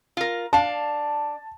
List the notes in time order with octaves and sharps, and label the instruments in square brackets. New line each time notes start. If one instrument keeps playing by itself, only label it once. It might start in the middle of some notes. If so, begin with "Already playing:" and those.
[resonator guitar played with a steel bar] F4 A#4
[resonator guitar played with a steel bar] D4 F5 [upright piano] A5